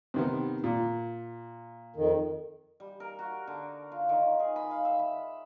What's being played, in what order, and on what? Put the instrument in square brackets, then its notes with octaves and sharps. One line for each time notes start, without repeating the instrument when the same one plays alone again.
[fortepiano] C3 D#3 B3
A#2
[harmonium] F2 D#3
[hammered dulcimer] G3
A#4
F#4
D3
F4
D#3
G#4
B5
F5
E5
B5